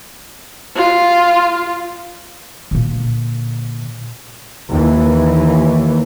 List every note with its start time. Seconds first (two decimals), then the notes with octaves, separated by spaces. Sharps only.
0.76 F4
2.71 A#2 D3
4.71 D#2 E3